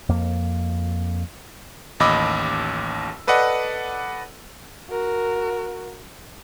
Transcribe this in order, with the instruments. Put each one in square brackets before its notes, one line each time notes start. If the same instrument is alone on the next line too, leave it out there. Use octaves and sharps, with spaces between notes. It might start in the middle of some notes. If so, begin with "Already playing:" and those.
[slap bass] F2 A#3
[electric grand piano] A1 D#2 D#5 B5 D6 E6
A4 B4 D5 D#5 F#5
[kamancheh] F#4 A#4